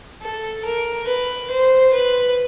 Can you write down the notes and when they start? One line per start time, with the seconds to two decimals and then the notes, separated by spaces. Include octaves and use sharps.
0.22 A4
0.65 A#4
1.07 B4
1.51 C5
1.93 B4